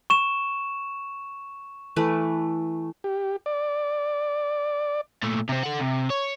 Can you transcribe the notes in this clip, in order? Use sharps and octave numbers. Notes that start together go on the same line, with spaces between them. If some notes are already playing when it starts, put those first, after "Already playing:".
C#6 E7
E3 A3 B4
G4
D5
A#2 A3
C3 C4
A4 F#5
C3
C#5